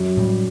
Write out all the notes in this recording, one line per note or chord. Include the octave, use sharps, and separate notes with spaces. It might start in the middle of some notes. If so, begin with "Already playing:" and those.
Already playing: F#2
A2 G3